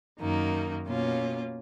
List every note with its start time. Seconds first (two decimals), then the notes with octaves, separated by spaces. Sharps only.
0.19 F#2 D#3 A#3 D#4
0.86 B2 A#3 C#4 F4